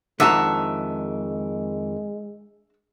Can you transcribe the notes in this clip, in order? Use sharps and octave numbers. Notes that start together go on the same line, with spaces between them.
F2 D#3 G#3 D4 E5 F#5 A5 A#5